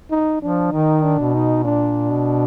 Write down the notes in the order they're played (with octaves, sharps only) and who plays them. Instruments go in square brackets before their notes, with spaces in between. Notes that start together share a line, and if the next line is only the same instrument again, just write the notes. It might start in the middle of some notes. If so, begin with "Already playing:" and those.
[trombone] D#4
[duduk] F3 [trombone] D4
[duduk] D#3 [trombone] D#4
[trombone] D4
[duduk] B2
[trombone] D#4
[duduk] A#2 [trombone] D4
[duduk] B2